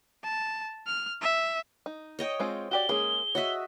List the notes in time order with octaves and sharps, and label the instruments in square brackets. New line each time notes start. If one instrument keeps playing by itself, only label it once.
[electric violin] A5
F6
E5
[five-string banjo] D#4
[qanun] C#5 D#5 G5
[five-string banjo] G#3 C4 F4
[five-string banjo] F#4 G4 D5 [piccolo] G7
[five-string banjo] G#3 A#3 C#4 [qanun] G#4
[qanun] F#4 D#5 E5 [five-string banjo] C#5